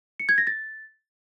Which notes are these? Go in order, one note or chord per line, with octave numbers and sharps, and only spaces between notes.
C#7
G#6
A#6
A6